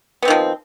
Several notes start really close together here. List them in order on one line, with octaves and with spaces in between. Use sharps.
B3 C4 D#3 F3